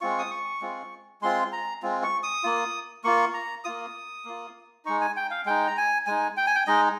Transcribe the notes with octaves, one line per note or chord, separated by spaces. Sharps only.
G#3 C4 F4 C#6
D#6
C#6
G#3 C4 F4
G#3 C4 F4 C6
A#5
G#3 C4 F4
C#6
D#6
A#3 F4
A#3 F4 C#6
A#5
A#3 F4 D#6
A#3 F4
G#3 D#4 C#6
G#5
G5
F5
G#3 D#4 G5
A#5
G#5
G#3 D#4 G#5
G5
G#5
G5
G#3 D#4 D#5